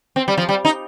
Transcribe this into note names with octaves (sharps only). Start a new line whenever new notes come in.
C4
G3
F3
G3
D#4